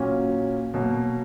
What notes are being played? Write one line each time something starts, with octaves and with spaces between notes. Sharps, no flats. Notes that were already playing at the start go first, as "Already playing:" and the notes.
Already playing: A#2 F#3 C#4
B2 F#3 A#3